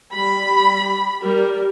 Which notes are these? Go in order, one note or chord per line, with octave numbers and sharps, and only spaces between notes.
G3 B5
G3 A#4